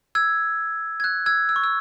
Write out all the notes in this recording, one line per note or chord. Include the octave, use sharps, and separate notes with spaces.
E6 G#6
G#6
F#6
E6 G#6
E6
C#6
E6